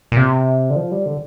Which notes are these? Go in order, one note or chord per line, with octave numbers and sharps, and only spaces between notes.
A#2
C3
D3
F3
G3
D3